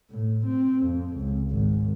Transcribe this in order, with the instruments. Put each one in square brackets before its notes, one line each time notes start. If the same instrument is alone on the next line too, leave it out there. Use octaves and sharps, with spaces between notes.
[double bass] A2
C4
F2
C#2
G#1